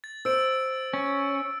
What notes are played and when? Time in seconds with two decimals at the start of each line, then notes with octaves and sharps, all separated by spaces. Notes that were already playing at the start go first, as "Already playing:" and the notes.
0.04 A6
0.25 C5 E6 D7
0.94 C#4